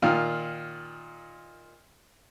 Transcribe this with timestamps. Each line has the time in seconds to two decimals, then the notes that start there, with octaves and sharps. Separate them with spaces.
0.02 A#2 D#3 F4